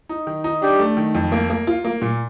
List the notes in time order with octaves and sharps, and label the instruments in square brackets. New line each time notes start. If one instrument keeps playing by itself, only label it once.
[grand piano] D#4
D#3
D#4
[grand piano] D4 [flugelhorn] G4
[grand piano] A3
D#3
F2
A#3
A#3
F4
A#3
A#2